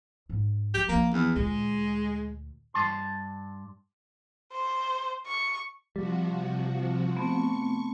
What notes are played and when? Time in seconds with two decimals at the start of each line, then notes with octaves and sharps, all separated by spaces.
0.29 G#2
0.74 F#3 G4
0.89 F3 A#3 D4
1.13 E2
1.36 D2 A#2 G#3
2.74 G2 A5 C6
4.53 C5
5.27 C#6
5.96 C3 F3 G3 F#4
7.17 A3 B3 C4 C#6